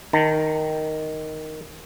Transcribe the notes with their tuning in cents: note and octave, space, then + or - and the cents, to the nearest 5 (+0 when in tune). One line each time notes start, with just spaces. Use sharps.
D#3 +0 A5 +45